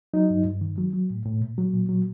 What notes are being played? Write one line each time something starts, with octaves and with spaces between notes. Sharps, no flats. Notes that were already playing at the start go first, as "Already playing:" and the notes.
F#3 D#4
G2
G2
D#3
F#3
F#3
A2
A2
A#2
F#3
A#2
F#3